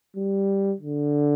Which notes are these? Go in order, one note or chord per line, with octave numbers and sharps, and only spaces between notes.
G3
D3